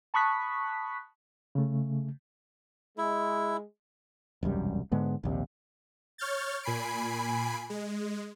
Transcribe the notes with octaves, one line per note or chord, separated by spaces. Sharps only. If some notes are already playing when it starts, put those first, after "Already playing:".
A5 B5 C#6 D#6 F#6 B6
C#3 A3
G#3 E4
E1 C2 F#2 G3
G#2 D3 G#3 B3
A#1 D#2 C3
C#5 F6 G6 A6
A#2 G#5 B5 C7 D7
G#3